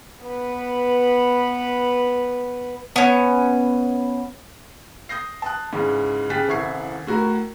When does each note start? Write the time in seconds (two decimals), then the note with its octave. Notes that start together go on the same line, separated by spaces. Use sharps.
0.25 B3 B4
2.96 B3 C#4
5.09 D#6 G6 A#6 C7
5.42 A5 D#6 F#6
5.73 G#2 C#3 E3
6.30 C#3 G4 G#4 F#6 A6 B6
6.48 D#1 C2 E4 C#6 G#6 C7
7.07 A2 F#4 A#4 A#5